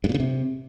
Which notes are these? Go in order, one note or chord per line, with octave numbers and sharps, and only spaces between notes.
G2
A#2
C#3
C3